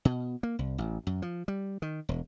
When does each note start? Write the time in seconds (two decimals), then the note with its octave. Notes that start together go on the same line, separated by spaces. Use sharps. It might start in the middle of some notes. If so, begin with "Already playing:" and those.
0.05 B2
0.43 A#3
0.59 C2
0.78 A1
1.07 F#2
1.22 F3
1.48 G3
1.82 D#3
2.09 E1